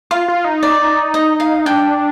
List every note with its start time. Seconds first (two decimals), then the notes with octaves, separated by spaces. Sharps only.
0.11 F4 F5
0.28 F4
0.44 D#4
0.63 D5
1.14 D#5
1.40 F5
1.66 D4 G5